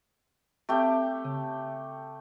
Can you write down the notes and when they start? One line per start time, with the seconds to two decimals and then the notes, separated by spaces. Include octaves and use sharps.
0.69 A3 C4 G4 G5
1.25 C#3